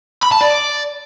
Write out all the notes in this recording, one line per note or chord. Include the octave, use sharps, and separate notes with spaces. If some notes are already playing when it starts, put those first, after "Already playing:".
B5
A5
D5